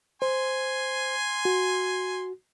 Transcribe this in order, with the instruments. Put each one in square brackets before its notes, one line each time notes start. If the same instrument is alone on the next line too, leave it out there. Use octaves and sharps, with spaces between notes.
[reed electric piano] C5 [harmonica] G#5 C6
[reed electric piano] F#4